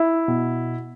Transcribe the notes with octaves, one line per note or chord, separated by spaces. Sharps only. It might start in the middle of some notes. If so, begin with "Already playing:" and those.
Already playing: E4
B2